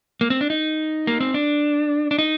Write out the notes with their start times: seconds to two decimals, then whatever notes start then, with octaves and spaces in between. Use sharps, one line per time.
0.21 A#3
0.30 C4
0.41 D4
0.50 D#4
1.07 A#3
1.20 C4
1.34 D4
2.11 D4
2.19 D#4